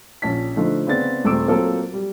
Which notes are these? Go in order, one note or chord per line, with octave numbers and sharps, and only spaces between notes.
A#1 A#2 C#4 A5 B6
D3 F3 A3 D#4
C#3 B3 C4 D5 A6
D#1 A3 C4 D6 E6 D7
F#3 A#3 C4 F4 A4
G3